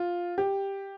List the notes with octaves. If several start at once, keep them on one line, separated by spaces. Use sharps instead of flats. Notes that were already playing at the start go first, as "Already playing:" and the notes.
Already playing: F4
G4